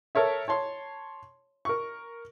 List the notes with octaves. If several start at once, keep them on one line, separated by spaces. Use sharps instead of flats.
A4 A#4 C#5 E5
C#5 A5 C6
A#4 C#6